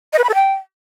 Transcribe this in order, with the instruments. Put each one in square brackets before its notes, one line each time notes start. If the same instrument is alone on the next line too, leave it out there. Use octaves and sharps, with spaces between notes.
[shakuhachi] D#5
B4
B5
A4
G5